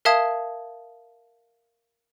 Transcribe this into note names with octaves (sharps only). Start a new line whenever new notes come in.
A#4 E5 F5 A5 D#6 G#6